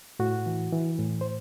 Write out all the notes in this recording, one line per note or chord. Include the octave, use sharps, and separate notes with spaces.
A2 F#4
E3
E3
A2
C5